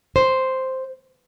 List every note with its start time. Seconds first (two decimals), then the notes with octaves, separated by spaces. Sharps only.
0.16 C5